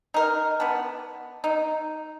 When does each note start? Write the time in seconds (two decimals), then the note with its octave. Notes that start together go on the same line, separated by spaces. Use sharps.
0.14 D#4 A#4
0.60 B3 D4
1.44 D#4